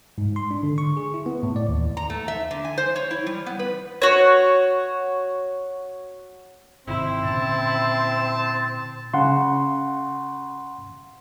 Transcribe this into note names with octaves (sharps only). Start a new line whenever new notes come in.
G#2
C6
D4
D3
C#6
G#4
E4
B3
A2
D5
D#2
A#5
A3
E5
D3
G#5
C5
C#5
E4
G3
B3
B4
F#4 C#5
G#1 C3 D#3 C4 E4
A#2 D3 C#4 A5
C#3 F#5 C6